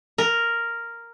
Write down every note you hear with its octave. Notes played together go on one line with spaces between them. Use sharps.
A#4